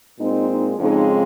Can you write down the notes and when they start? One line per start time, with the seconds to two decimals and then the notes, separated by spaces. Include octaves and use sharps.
0.19 A#2 G#3 C4 D#4
0.48 D#4
0.78 F2 C#3 G#3 C4 D#4